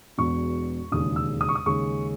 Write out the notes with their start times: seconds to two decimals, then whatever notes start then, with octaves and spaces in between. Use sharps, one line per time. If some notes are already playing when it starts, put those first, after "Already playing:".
0.18 E1 E2 B2 C#6
0.92 E1 D#2 C#3 D#6
1.16 E6
1.41 D#6
1.49 C#6
1.55 D#6
1.66 D#2 C#3 G#3 C#4 C#6